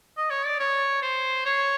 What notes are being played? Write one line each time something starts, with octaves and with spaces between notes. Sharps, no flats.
D#5
C#5
D5
C#5
C5
C#5